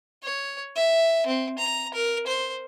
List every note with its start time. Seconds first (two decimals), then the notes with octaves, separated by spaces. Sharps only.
0.23 C#5
0.76 E5
1.27 C4
1.59 A#5
1.94 A#4
2.27 C5